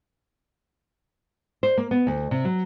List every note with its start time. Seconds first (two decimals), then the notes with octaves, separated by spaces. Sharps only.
1.63 C5
1.77 A#3
1.91 B3
2.07 D2
2.31 C3
2.45 F#3